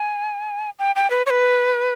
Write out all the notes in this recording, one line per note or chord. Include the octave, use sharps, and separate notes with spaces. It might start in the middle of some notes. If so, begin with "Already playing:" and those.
Already playing: G#5
G5
G5
B4
C#5
B4